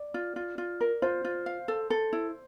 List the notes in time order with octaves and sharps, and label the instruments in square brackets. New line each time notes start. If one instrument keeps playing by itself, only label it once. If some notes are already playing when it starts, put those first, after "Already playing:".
Already playing: [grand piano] D5
[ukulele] F4
F4
F4
A#4
[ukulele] F4 [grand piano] C5
[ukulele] F4
F5
A4
A4
E4